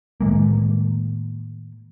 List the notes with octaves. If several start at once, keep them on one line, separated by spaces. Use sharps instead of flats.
A2 D#3 G#3 A#3